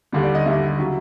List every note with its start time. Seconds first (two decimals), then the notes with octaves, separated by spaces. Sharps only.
0.13 D#2 D3 G3
0.23 D5
0.35 D#5
0.46 D#2 D3 G3 E5
0.79 C#3 F#3